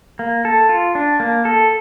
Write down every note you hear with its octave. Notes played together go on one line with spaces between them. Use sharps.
A#3
A4
F4
D4
A#3
A4